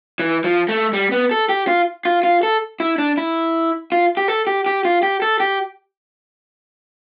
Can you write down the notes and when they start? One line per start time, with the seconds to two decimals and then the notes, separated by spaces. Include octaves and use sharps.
0.20 E3
0.44 F3
0.69 A3
0.93 G3
1.12 B3
1.31 A4
1.49 G4
1.68 F4
2.05 F4
2.24 F4
2.43 A4
2.80 E4
2.98 D4
3.17 E4
3.92 F4
4.17 G4
4.28 A4
4.47 G4
4.66 G4
4.85 F4
5.03 G4
5.22 A4
5.40 G4